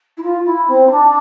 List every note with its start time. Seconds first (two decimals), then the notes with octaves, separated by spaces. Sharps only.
0.17 E4
0.22 F4
0.45 E4
0.68 C4
0.86 E4
0.91 D4